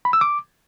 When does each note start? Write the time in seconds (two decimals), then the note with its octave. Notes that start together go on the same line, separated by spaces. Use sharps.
0.05 B5
0.13 E6
0.21 D6